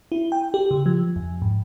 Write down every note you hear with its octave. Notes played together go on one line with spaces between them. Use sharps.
E4
G5
G4
C#3
F3
F2
G#2